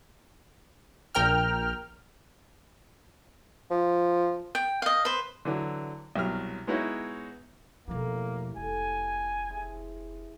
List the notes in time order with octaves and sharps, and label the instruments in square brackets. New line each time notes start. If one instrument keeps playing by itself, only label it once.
[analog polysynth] A#1 A#4 G5 F6
[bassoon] F3
[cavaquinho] G5
D#5 F5
B4 C5
[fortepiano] D3 E3 F#3
C2 B2 F#3 F6
G#3 B3 D#4 E4 F#4 C#5
[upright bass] E1 F3 [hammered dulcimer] A2 G4 [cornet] A#3
[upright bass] F1 [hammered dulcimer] A4 [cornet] G#5
[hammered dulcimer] E4 G#4 C5